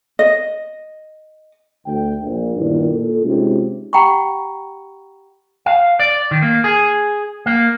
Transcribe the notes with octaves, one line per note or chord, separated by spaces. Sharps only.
D#5
D2 G5
A#1
G1 G2 A#2 D#3 D4 E4
A#2 A4
C3 G#3 C#4 D#4 F4 F#4
G4 F#5 G5 A#5 B5 C#6
F5
D5
D#3
A#3
G#4
A#3